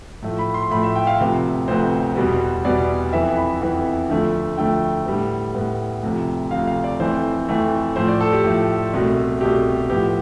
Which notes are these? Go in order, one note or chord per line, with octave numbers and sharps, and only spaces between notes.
A2 F3 A3
B5
C6
A2 F3 A3 B5
E5
G5
F5
D2 C3 F3 B3
D2 C3 F3 B3 C5
E2 B2 G3 B3
E2 B2 G3 B3 D5
F2 E3 B3 E5
B5
F2 E3 B3
D2 D3 F3 A3
D2 D3 F3 A3 G5
A2 G3 B3
A2 G3 B3
D2 C3 F3
D2 C3 F3 F5
F5
D5
F2 E3 A3 C5
F2 E3 A3
A2 F3 A3 C5
D5
A4
G4
A2 F3 A3
C2 B2 A3
C2 B2 A3 G4
A2 F3 B3 G4